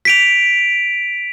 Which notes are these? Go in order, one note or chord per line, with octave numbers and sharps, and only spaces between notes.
B6 D7 F7